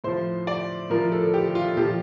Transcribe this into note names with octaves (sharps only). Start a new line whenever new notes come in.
A2 F3 C5
D5
A2 F3 A#4
A4
G4
F4
A#2 F3 G4